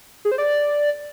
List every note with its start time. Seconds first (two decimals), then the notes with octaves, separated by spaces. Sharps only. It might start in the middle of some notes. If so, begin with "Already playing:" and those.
0.25 G#4
0.31 C5
0.38 D5